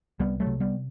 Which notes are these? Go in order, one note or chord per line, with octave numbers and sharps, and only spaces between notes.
C2 G3 B3
F#3 A3
C3
G3 B3